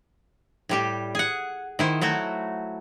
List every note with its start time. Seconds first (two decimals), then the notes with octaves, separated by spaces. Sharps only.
0.69 A2 G3 G4
1.15 G#4 F#5
1.79 D#3 E4 C5
2.01 F#3 A3 E4 F#4